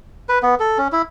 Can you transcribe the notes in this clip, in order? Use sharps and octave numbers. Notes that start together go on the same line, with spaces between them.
B4
B3
A4
C#4
E4